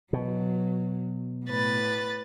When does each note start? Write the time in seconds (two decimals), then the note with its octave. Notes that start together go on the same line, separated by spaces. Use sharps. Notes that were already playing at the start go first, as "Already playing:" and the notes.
0.13 B2 F#3
1.46 A2 B4 A6